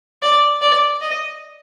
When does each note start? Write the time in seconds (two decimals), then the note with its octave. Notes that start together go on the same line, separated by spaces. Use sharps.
0.22 D5
0.61 D5
1.02 D#5